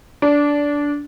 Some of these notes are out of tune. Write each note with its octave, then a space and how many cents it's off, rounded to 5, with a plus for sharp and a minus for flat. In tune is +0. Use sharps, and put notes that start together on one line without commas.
D4 -15